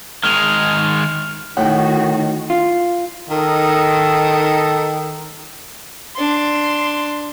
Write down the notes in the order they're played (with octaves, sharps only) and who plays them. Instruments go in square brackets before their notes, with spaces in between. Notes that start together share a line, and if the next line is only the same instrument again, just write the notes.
[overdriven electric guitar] D#3 G#3 [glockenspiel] F6 F7
[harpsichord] A2 [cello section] D#3 F#4 [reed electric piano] F#5 G5
[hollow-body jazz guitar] F4
[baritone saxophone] D#3 [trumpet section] D#4 A4
[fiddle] D4 C6